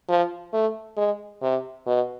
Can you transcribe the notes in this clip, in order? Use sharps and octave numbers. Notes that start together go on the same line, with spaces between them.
F3
A3
G#3
C3
B2